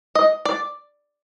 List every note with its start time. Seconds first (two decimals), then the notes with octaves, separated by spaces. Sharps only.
0.15 D#5
0.45 D5